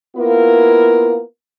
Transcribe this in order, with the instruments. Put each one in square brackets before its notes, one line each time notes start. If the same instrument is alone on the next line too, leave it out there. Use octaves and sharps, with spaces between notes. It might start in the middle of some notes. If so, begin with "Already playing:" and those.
[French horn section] A#3 B3 E4 F4 A#4